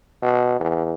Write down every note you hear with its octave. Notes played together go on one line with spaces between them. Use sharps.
B2
E2